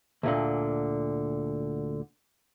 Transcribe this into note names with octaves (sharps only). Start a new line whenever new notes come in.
D2 A#2 D3